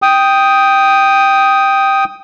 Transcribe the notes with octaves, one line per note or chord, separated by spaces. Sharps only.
G5 D#6